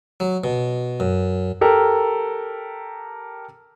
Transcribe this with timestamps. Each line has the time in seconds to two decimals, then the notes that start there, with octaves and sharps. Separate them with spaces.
0.20 F#3
0.44 B2
1.00 F#2
1.61 G4 A4 A#4